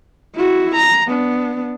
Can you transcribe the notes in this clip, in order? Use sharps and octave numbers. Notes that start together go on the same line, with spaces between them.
E4 F#4
A#5
B3 D4